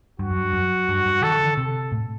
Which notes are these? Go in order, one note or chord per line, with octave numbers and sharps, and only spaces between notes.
G2 F#4
F#2
G2
F#2
G2
G2
D#3 A4
D3
C3 A4
A2